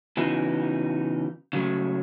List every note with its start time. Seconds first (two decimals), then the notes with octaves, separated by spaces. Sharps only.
0.17 C#3 E3 B3 D#4 F#4
1.53 C#3 F#3 A3